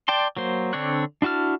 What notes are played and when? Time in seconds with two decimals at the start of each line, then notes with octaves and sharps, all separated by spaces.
0.08 D5 G5 A5 C6
0.37 F#3 A#3 C5
0.73 D3 C4 D4 C#5 F#6
1.22 D4 E4 F#4 A5 F6